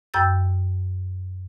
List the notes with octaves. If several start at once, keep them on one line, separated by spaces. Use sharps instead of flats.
F#2 G5 E6 G6 A6